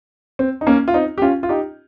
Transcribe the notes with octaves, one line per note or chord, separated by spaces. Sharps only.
C4
D#4
A#3 C#4
F4
C4 D#4
G4
C#4 F4
F4
D#4 G4